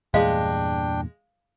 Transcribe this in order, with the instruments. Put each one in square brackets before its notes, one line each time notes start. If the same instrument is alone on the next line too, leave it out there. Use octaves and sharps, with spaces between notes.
[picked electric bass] E2 G2 A#2 [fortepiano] G#3 [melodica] D4 G5 [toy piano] F5